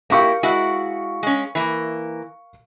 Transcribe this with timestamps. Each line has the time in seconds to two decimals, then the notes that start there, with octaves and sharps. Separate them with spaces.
0.10 A#3 E4 G4 A#4 F5 C#6
0.43 G#3 E4 F#4
1.23 G#3 C#4
1.55 E3 A#3